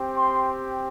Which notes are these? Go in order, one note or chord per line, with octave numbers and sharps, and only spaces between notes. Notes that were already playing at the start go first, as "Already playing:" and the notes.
Already playing: C4 G4
C6